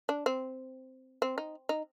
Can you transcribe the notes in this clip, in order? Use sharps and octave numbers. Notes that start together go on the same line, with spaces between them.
D4
C4
C4
D#4
D#4